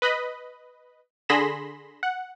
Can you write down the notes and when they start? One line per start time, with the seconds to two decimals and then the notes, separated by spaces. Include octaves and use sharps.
0.02 B4 D#5 B5
1.29 D3 G#4 B5 C6 A#6 E7
2.03 F#5